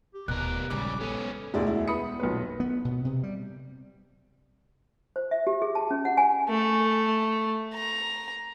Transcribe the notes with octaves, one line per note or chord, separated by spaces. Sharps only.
G4
D#1 B2 A#4 F#6
A#1 C#3 G3 G#3 D6
B3 C#4 A4
E1 D2 G#3 E4 D5
E4
B3 B5 D#6 C#7
B1 A#2 B4
B3
B2
C3
G3
C5
E5
G4
G#4
A5
C#4
F#5
G#5
A3
A#5